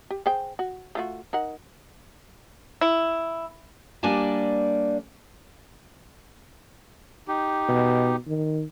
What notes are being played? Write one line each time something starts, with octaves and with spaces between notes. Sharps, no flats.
G4
G#4 C5 G5
F#4
A3 F4 F#4
D#4 A#4 F#5
E4
G3 A#3 D4 D5 G#5 A5
D#4 G4
B2
D#3